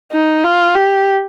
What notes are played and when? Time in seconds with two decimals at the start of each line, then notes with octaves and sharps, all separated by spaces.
0.12 D#4
0.44 F4
0.75 G4